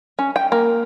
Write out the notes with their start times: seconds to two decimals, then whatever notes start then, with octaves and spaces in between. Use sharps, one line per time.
0.19 C#4
0.36 G5
0.52 A#3